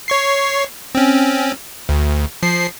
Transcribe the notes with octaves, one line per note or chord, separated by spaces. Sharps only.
C#5 C#6 C7
C4 C#4
D2
F3 C7